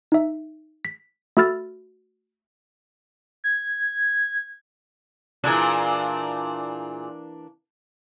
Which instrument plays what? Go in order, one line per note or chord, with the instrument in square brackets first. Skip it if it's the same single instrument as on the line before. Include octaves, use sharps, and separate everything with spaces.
[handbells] D#4 E5
B6
A3 F#4 B5 E6 F6 A6
[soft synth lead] G#6
[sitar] A#2 G#4 [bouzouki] E3 A#3 D4